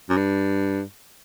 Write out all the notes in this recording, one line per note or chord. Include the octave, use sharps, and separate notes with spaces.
F#2
G2